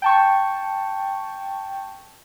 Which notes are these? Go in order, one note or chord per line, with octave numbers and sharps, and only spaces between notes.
G5 A5 C#6